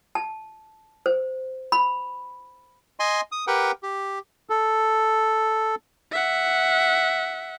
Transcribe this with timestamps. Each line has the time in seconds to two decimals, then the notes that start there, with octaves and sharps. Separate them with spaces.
0.15 A5
1.06 C5
1.72 B5
3.00 D#5 G#5 C6
3.32 D#6
3.47 G4 A#4 B4 F#5 G5
3.83 G4
4.50 A4
6.11 E5 F#5